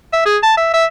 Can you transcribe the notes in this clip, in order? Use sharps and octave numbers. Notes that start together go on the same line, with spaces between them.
E5
G#4
A5
E5
E5